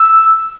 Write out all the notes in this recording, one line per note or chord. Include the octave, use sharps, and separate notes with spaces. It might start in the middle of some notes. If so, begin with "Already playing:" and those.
Already playing: E6